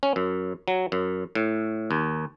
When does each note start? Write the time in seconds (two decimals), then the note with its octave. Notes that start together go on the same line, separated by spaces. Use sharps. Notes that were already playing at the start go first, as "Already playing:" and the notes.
0.03 C#4
0.16 F#2
0.68 F#3
0.92 F#2
1.35 A2
1.91 D#2